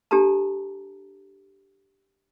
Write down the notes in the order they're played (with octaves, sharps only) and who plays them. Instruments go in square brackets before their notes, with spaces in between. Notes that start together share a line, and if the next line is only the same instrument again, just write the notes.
[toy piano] D4 G4 A4 A5 A#5